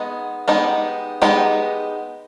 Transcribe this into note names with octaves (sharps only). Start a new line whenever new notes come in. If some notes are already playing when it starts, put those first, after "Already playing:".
Already playing: G#3 B3 D#4
G#3 B3 D#4 G4
G#3 B3 D#4 G4